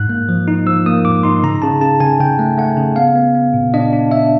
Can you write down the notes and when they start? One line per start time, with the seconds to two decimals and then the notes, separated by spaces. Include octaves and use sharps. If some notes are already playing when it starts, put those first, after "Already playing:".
Already playing: G#2 F#6
0.09 A#3
0.29 F3
0.48 D#4
0.67 F3 E6
0.86 A#3 D#6
1.04 G#2 D6
1.23 D#4 C6
1.43 C#3 A#5
1.62 C#3 A5
1.81 C#3 A5
2.00 C#3 G#5
2.20 C#3 G5
2.39 A3
2.58 A3 F#5
2.77 C#3
2.96 B3 F5
3.15 B3
3.35 B3
3.54 A#2
3.74 D4 D#5
3.93 D4
4.11 D4 E5